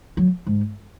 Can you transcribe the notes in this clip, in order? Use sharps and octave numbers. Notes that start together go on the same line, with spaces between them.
F#3
G#2